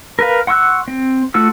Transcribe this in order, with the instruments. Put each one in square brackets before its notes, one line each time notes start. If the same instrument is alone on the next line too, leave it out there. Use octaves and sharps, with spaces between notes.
[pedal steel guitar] A#4 B4 F5
F#5 C6 C#6 E6 F#6
C4
A3 F4 F#4 E6